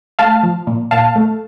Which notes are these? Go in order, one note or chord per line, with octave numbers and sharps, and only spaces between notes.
A3 F5 A5
F3
A#2
A#2 F5 A5
A3